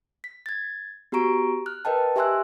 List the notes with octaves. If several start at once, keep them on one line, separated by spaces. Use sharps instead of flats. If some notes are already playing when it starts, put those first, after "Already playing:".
B6
G#6 A6
B3 F#4 G4 A#5 C#6 D7
F6 F#6
A#4 B4 D#5 G5 A5
G4 E5 G#5 C6 E6 F#6